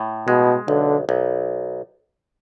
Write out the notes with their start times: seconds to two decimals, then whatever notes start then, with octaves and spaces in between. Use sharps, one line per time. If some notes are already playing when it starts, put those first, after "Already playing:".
Already playing: A2
0.27 B2 G#3
0.68 B1 D3
1.09 B1